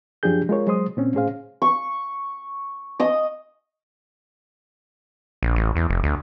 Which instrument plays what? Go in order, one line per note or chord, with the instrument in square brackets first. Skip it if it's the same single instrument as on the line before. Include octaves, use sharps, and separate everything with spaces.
[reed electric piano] F#2 F3 D4 G4 G#4 G6
G#3 F4 A#4 C#5
F#3 G#3 C5 C6 D#6
A#2 C4 C#4
A2 C#4 G#4 C5 F5
[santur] C#6
D#5 D#6
[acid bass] A#1
A1
E2
F1
D2